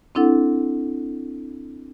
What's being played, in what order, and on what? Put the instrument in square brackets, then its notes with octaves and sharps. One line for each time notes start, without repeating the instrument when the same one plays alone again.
[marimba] C4 D4 E4 A4 F#5